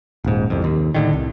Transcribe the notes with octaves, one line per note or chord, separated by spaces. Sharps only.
D#1 G#2
C2 F2
D#2
A2 D3 D#3
C2